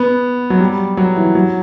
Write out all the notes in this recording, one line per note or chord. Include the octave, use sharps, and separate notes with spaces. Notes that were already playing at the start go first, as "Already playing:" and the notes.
Already playing: B3
F#3
G3
F#3
E3
F#3